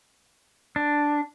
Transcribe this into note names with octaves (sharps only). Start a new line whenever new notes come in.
D4